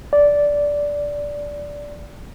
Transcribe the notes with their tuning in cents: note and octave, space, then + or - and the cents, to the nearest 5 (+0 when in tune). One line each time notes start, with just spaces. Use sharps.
D5 -10